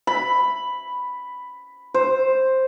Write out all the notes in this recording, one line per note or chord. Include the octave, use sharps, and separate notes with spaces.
B5
C5